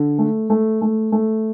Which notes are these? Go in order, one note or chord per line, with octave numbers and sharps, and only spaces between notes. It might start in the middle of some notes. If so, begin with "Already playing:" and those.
Already playing: D3
A3
A3
A3
A3